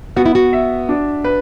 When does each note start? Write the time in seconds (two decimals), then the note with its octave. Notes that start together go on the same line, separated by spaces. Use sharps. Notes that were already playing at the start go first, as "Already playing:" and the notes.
0.16 B3 F#4
0.26 E4
0.35 F#4
0.53 E5
0.89 D4
1.24 B4